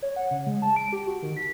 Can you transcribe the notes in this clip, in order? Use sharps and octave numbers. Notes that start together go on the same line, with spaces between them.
C#5
F#5
C#3
G#3
A5
D7
G4
F#4
D#3
B6